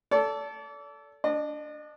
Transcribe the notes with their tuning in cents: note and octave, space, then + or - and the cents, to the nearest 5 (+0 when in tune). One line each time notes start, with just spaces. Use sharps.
A4 +0 D5 -35
D4 -10 D#5 -45